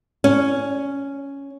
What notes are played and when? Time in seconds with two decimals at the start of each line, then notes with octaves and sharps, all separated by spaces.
0.24 C#4